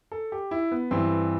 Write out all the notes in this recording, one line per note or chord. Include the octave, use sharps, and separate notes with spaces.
A4
G4
E4
B3
G2 E3 C4